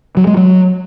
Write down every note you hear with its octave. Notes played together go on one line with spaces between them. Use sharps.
F#3
G#3
F#3